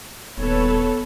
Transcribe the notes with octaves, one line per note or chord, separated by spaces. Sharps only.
D#1 B3 A4 B4 C#5